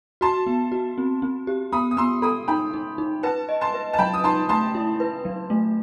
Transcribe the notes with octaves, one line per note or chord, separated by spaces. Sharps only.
F#4 A5 C6
B3
F#4
C4
C4
G4
B3 B5 D#6
D#6
B3 C6 E6
A4 B5 D#6
D#4 G5 B5
D#4
D#4
B4 F#5 A5
D#5
A5 C6
B4
A5
F#3 G5 B5
D#6
D#4 A5 C6
A3 A5 C6
E4
B4
F#3
A3